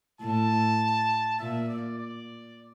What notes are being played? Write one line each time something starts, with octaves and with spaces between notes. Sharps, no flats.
A2 A5
A#2 E5
D5
D5